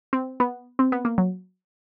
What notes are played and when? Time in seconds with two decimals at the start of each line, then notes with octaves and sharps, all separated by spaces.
0.13 C4
0.40 B3
0.79 C4
0.92 B3
1.05 A#3
1.18 F#3